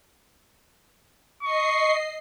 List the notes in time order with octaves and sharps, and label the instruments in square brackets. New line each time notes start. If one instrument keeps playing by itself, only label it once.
[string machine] D#5 C7 [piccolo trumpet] C#6